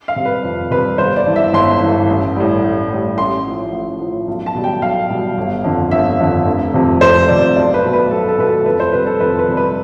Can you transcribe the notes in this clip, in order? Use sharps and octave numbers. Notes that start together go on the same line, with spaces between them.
F5
C3 G3
B4
F2
C3 G3 B4
G1 C5
D5
G2 E3
E5
G1 C6
G2 E3
A1
A2 G3
A1
A2 G3
A1 C6
A2 F3
A1
A2 F3
B1
A5
B2 G3
G5
B1 F5
B2 G3
G1
F2 D3
G1 E5
F2 D3
F1
F2 C3
F1 C5
F2 C3 D5
B1 D5
B4
B2 A3
B4
B1 A4
A4
B2 A3 B4
A4
F2 B4
C5
C3 G3 B4
A4
F2 B4
B4
C3 G3
B4